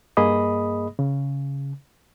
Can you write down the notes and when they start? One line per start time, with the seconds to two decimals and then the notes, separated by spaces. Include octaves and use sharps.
0.17 G2 A#3 G#4 D#5 B5 D#6
0.99 C#3